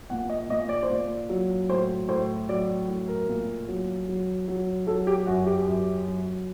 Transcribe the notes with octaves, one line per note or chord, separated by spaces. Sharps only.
A#2 F#5
D#5
A#2 D#5
D5
C5
A#2
D5
F#3
A2 C5
A2 C5
F#3 D5
A2
A#4
A#2
F#3
F#3
F#3
F#3 A4
G4
F#2 F#4
G4
F#2
F#3